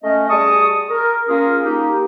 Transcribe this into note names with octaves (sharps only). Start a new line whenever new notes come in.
A3 C#4 D#5
G3 G#4 A5 C#6 D#6
A#4
A#3 C#4 F4 G#4 A#4
A#3 D#4 G4